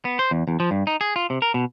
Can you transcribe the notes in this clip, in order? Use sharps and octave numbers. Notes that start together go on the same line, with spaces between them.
B3
C5
E2
E2
F3
G2
D#4
G#4
F4
C3
A#4
B2